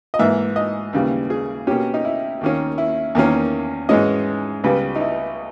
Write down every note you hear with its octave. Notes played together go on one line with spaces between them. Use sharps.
D#5
G#2 E3 A#3 E5
D#5
D#2 C#3 E3 G3
G#4
B2 A#3 C#4 G4
D#4
E4
D#2 D#3 A#3 C#4
E4
E2 D#3 A#3 C#4
G#2 E3 G#3 C#4 D#5
C#2 C#3 G3 B3 B4
D#4
E4